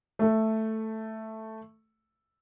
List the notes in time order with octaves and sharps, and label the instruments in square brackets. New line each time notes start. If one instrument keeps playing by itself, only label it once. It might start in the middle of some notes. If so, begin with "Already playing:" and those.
[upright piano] A3 A4